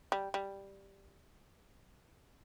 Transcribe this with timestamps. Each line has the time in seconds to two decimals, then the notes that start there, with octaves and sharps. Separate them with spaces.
0.12 G3
0.34 G3